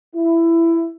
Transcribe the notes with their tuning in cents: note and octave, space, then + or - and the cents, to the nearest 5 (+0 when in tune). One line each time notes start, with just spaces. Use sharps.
E4 +15